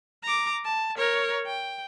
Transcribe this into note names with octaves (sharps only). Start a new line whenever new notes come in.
A#5 D6
A5
A#4 C#5
G5